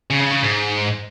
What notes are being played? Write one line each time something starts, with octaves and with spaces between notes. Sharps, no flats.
C#3
C#3
C#3
G#2